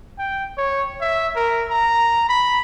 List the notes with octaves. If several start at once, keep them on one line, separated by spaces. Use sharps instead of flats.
G5
C#5
E5
A#4
A#5
B5